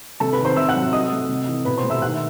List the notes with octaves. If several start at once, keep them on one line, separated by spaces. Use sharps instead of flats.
C3 A4 A5
B4 B5
D#3
C5 C6
C3 E5 E6
F#5 F#6
F#3
F#3 D#5 D#6
A3
C3
E3
B2 B4 B5
C5 C6
A3
E5 E6
D#3 F#5 F#6